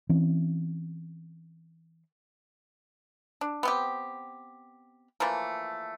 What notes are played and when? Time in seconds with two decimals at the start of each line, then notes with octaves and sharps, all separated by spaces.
0.09 E3 C4 C#4
3.41 D4
3.63 B3 C4 G4
5.20 E3 F3 A3 A#3